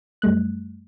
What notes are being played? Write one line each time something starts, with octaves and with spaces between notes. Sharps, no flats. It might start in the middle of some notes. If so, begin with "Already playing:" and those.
F#2 G3 A3 F#6